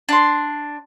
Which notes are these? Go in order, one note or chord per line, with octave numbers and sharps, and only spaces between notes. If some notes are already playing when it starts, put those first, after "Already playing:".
D4 C6